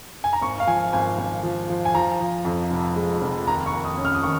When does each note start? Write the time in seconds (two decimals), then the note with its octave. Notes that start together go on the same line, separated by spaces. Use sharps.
0.24 G#5
0.33 A#5
0.41 G#1 C#6
0.60 F5
0.67 F3 G#5
0.93 G#1 G#5
1.18 G#1
1.43 F3
1.69 F3
1.85 G#5
1.95 F3 A#5
2.20 F3
2.45 F2
2.71 F1
2.96 G#3
3.22 F1
3.46 D#2 A#5
3.66 C#6
3.73 D#2
3.85 D#6
3.97 C#4
4.05 F6
4.15 D#6
4.23 D#3 C#6